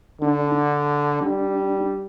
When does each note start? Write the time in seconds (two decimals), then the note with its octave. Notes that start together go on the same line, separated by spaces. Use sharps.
0.21 D3 D4
1.21 G3 D4